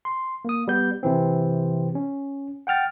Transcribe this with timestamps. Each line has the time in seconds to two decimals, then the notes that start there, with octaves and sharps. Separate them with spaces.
0.05 C6
0.45 A#3 D#6
0.67 G3 B3 G6
1.03 C3 E3 C4
1.95 C#4
2.67 F#5 G5 F6 A6